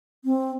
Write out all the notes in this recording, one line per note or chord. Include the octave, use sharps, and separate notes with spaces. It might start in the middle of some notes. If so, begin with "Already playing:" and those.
C4